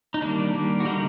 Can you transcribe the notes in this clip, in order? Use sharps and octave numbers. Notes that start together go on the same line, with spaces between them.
D#4
D#3 G3 A#3 D4
D#3 G3 A#3
F#4
D3 G3 A#3 D#4